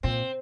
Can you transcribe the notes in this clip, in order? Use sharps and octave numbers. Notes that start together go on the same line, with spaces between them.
A#2 C4